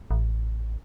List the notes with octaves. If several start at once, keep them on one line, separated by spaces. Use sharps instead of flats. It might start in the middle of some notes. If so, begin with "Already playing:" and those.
A1